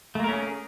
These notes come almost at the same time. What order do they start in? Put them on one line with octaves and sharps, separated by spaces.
A3 A#3 A#4 C#4 G#4